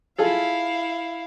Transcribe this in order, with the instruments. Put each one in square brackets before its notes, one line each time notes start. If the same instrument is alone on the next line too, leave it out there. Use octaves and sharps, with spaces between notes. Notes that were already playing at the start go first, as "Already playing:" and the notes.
[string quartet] E4 F5 [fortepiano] F4 G#4 A4